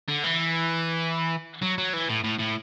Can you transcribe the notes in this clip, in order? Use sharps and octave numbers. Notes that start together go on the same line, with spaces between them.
D3
E3
F#3
F#3
E3
A2
A2
A2